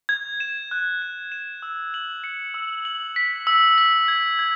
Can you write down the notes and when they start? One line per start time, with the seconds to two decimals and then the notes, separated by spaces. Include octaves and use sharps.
0.09 G#6
0.40 E7
0.71 F#6
1.02 F#6
1.32 E7
1.62 E6
1.94 F#7
2.24 C#7
2.54 E6
2.85 F#7
3.16 B6
3.47 E6
3.78 B6
4.08 G#6
4.39 G#6